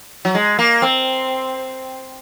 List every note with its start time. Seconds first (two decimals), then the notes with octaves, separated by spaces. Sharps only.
0.25 F#3
0.35 G#3
0.59 A#3
0.82 C4